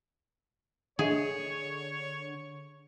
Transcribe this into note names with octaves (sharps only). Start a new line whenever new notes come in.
D3 D4 G#4 C#5 D#5 E5